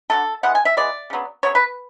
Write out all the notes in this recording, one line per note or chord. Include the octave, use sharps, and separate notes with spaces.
D3 F#3 A3 A4
E3 G#3 B3 F#5
G#5
E5
E3 G#3 B3 D5
C#3 F#3 B3
C#3 F#3 B3 C#5
B4